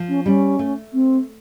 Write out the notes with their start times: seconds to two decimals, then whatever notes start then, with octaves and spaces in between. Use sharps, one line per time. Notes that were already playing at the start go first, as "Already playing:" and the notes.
Already playing: F3
0.09 C#4
0.26 G3 C#4
0.59 A3
0.93 C4